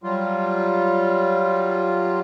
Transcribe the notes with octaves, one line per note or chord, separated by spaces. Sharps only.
F#3 G3 F4